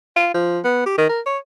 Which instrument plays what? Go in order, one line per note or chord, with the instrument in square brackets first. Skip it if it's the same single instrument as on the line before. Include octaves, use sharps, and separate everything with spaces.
[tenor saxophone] F4
F3
B3
G4
D#3
A#4
C#5